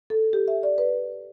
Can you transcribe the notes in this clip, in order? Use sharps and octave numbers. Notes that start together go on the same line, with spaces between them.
A4
G4
E5
D5
B4